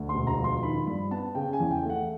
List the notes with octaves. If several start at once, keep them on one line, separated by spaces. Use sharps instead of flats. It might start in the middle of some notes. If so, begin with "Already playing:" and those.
Already playing: D2
C6
E1
A#5
F3
C6
D#3 B5
G2 B5
B3 A5
C#3 G5
G#5
E2
G5
A3
F#5